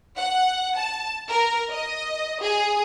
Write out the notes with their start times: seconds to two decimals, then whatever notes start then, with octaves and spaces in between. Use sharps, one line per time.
0.17 F#5
0.77 A5
1.28 A#4
1.71 D#5
2.41 G#4